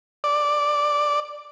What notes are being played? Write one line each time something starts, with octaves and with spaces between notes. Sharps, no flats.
D5